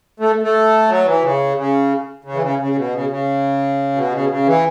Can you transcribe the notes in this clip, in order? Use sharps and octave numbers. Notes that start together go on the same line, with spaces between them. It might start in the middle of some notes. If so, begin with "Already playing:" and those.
A3
A3
F#3
E3
C#3
C#3
C#3
E3
C#3
C#3
B2
C#3
C#3
B2
C#3
B2
C#3
E3